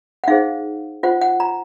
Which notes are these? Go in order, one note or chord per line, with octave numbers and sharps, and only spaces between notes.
F#5
D#4 G#4 C5 F5
F4 C5 F#5
F#5
A#5